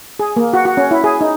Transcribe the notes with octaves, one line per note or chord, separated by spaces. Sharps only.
G#4
A#3
F#4
F#4
C#4
E4
G#4
D#4